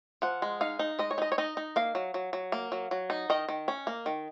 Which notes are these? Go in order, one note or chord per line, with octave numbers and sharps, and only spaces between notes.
F3 F#5
G#3
D#4 F5
D#4
G#3 D#5
C#5
D#4 D#5
C#5
D#4 D#5
D#4
A#3 F5
F#3
F#3
F#3
A#3
F#3
F#3
D#4
D#3 D#5
D#3
C#4
A#3
D#3